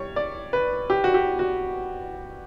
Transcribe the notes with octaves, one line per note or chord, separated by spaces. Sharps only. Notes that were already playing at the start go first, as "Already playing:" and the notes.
Already playing: G3 C#5
D5
B4
G4
F#4
G4
F#4